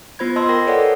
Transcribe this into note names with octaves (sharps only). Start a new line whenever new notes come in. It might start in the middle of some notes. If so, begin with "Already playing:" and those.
B3 F4 C5 B5 G#6
D#5 A5 C6 E6
A#4 G5 A#6
A4 B4 C#5 D5 F#5